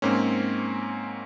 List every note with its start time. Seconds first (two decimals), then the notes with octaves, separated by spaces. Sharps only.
0.02 G#2 A#3 C4 C#4